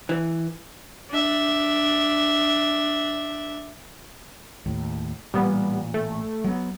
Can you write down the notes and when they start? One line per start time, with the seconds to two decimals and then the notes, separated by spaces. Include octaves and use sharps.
0.09 E3
1.10 D4 E5
4.66 D#2 A2
5.34 A1 A#2 G3 B3
5.94 A3
6.44 F#3 G#3 B3